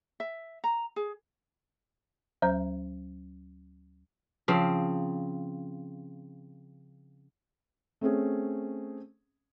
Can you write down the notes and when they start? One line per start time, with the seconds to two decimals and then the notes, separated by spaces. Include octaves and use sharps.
0.20 E5
0.64 A#5
0.96 G#4
2.42 D2 F#3 C5 A#5 G6
4.48 C#3 F3 C4
8.01 A3 C4 C#4 G#4